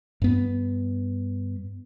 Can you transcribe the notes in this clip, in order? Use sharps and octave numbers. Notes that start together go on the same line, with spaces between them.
G2 B3